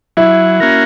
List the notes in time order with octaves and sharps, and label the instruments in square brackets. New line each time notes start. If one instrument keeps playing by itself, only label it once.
[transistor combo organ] F#3 [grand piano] E4
[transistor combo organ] A#3 C#4 F#4 A#4